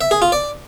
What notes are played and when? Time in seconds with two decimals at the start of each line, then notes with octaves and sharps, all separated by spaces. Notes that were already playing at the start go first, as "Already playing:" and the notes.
0.01 E5
0.11 G#4
0.22 F4
0.32 D5